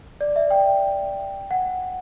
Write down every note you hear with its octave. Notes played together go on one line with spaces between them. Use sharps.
D5
E5
G5
F#5